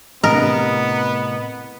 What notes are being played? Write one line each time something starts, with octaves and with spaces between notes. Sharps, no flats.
A2 C3 B3 A#4 D#5